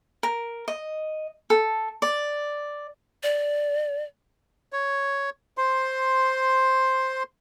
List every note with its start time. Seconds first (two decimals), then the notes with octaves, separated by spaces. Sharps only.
0.23 A#4
0.68 D#5
1.50 A4
2.02 D5
3.23 D5
4.73 C#5
5.58 C5 C6